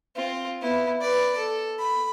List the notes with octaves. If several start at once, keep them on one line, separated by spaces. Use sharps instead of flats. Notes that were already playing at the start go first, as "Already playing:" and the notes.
C4 F4
B3 E4
B4 D5
A4
B5